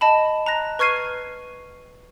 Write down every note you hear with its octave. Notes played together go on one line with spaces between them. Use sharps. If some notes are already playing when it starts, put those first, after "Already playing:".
D#5 A5 B5
A#5 F#6 A#6
B4 C#6 F6 G#6 C7 D#7